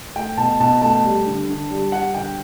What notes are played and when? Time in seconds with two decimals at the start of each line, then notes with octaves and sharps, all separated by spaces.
0.16 A3 G5
0.37 B2 A5
0.60 B2 A5
0.81 A3 A5
1.04 G3
1.26 D3
1.49 D3
1.70 G3
1.92 G3 F#5
2.14 D3 G5